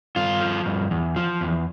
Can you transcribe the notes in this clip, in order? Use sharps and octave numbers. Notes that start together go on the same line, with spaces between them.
G2 F4
F3
G2
E2
F3
E2